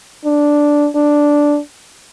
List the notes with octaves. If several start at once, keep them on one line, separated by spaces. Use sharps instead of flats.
D4
D4